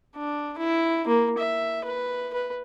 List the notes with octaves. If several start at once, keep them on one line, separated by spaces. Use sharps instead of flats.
D4
E4
A#3
E5
B4
B4